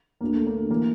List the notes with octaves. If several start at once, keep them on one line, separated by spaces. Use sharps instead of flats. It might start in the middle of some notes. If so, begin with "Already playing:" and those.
D2 D3 A#3
A3
A#3
E3 A#3